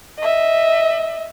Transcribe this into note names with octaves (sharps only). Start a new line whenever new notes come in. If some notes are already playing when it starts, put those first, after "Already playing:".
D#5 E5